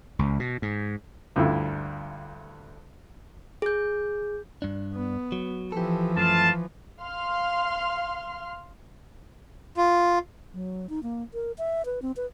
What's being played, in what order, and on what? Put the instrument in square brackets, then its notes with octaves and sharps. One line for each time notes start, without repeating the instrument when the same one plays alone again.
[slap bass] C#2
B2
G#2
[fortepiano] D2 G2 D3 E4 F4 E6
[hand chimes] G#4 G6
[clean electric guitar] G2 D4
[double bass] B3
[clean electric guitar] F#3
[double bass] E3 F3 [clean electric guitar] G4 A4
[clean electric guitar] F#2 A3 [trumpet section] F4 A5
[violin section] F5 C6 F6
[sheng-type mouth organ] F4
[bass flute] F#3
D#4
A#3
A#4
E5
B4
C4
B4